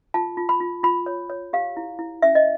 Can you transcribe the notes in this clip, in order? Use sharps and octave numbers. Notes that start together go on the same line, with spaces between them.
F4 A5
F4
B5
F4
F4 B5
C#5
C#5
G4 F5
E4
E4
C#4 E5
D#5